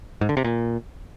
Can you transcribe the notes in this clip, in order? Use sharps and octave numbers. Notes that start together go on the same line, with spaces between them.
G#2
D3
C3
A#2